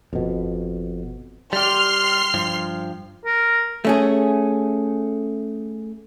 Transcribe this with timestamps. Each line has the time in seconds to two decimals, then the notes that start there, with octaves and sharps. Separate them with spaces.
0.13 G1 F2 B2
1.53 G3 G4 C6 F6 C7
2.34 G2 F3
3.25 A#4
3.85 A3 C#4 G#4